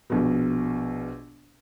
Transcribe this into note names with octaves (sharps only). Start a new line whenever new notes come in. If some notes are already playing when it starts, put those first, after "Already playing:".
A#1 B2